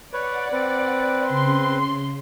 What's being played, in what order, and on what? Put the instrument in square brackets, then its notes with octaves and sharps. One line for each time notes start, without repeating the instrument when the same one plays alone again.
[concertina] B4 C#5 [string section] D5 [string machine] F#5
[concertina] C4 B4
[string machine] C#3 [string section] C6